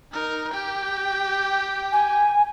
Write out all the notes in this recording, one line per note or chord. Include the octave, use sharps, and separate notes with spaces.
D#4 A#4
G4 G5
G#5